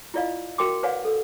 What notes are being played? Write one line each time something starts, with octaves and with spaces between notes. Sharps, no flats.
E4 F4 D5 D#5 F5
F#4 A#4 G5 C6 D6
B4 C#5 D5 F5 F#5 G#5
A4